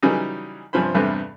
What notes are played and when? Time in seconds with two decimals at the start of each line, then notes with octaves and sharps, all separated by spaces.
0.03 C#3 E3 F#3 G3 C#4 D#4
0.73 G2 C3 F3 C#4 C5 B5
0.94 E2 G2 C3 G3 A3 B4